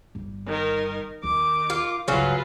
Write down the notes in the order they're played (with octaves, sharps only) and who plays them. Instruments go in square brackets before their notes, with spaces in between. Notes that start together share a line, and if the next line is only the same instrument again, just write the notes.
[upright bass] G1 G3
[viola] D#3 A#4
[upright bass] D#2 [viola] D#3 D6
[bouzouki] F4
[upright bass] G1 C#2 [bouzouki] C#3 F#3 [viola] F4 B4